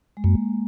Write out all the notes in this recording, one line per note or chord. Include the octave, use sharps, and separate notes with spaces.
G#3
F#2 A#3